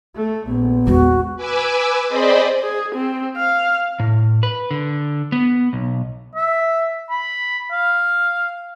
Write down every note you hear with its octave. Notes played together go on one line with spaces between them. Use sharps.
A3
A#1 B3
E2 G#3 F#4
B4 G#5 D6 E6
C4 G#4 C5 D5 D#5 B5
G#4
C4
F5
A2
B4
D3
B3
B1
E5
B5
F5